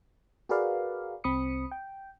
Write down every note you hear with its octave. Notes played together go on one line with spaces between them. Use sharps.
F#4 G#4 A#4 B4 D5 F5
C2 C4 B5 D#6 C#7
G5